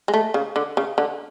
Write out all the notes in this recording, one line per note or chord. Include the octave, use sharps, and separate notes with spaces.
G#3
A3
C#3
D3
C#3
D3